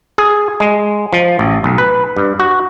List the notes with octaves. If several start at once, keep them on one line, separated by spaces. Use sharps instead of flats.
G#4
G#3
F3
A1
B1
B4
G2
F#4